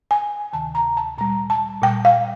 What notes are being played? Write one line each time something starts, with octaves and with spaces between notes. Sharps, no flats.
G#5
D2 C3 D#3 A5
A#5
A5
A#2 G3 A#5
A5
A#2 G3 G5
F5